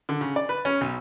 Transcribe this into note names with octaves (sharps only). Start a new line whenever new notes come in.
D3
C#3
D5
B4
C#4
B1